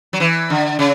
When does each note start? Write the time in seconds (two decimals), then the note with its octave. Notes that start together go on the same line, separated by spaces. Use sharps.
0.13 F#3
0.20 E3
0.50 D3
0.79 C#3